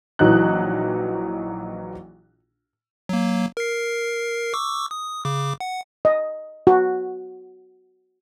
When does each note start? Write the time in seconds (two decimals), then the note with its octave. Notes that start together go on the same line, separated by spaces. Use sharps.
0.19 A#1 E3 F#3 D#4 F#6
3.09 F#3 A#3
3.57 A#4 C7
4.54 C#6 D6 E6
4.91 D#6
5.25 C#3 D6
5.60 F#5
6.05 D#5
6.67 F#4